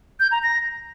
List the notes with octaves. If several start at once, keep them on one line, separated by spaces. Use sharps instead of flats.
G6
A#5
A#6